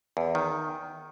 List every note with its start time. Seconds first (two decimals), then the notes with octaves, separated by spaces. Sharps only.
0.17 E2
0.35 D#3